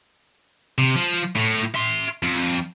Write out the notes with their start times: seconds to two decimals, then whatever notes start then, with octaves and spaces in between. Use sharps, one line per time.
0.78 C3
0.96 F3
1.36 A2
1.75 E5 C6
2.23 F2